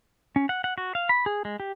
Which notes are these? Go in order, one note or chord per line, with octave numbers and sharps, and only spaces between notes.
C#4
F#5
F#5
F#4
F5
B5
G#4
G#3
G4